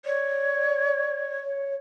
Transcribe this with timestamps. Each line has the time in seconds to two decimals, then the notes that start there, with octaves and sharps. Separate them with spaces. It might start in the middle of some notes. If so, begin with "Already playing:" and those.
0.05 C#5 D5
1.43 C#5